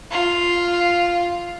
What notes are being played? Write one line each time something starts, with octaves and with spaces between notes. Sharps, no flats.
F4